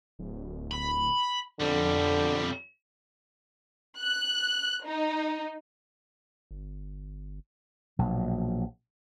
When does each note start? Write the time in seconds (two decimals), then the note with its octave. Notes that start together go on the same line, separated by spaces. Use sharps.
0.19 D1
0.71 B5
1.60 B1 F2 D3 G3
3.99 F#6
4.85 D#4
6.51 G1
7.99 A#1 B2 F#3